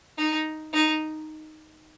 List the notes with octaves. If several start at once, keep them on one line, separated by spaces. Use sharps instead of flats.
D#4
D#4